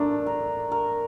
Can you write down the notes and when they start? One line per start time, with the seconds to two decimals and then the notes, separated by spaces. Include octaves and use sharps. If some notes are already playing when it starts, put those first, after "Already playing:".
Already playing: A3 D4 A#4
0.26 A#4
0.72 A#4